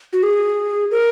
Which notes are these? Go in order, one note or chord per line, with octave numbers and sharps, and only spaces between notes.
F#4
G#4
A#4